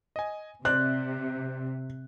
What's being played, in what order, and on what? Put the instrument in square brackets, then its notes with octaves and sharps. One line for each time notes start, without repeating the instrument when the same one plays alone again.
[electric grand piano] D#5 G#5
[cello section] C3 [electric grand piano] C5 D5 [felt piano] F#6